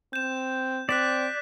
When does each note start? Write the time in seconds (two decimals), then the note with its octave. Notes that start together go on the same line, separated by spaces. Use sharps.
0.13 C4 G6 E7
0.89 C4 D5 F#6 B6 E7